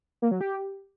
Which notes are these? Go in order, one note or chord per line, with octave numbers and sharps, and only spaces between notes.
A#3
F#3
G4